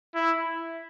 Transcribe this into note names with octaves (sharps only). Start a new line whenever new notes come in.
E4